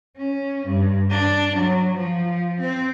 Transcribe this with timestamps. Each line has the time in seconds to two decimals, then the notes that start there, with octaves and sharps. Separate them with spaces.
0.17 C#4
0.66 G2
1.10 D4
1.56 F#3
1.96 F3
2.60 C4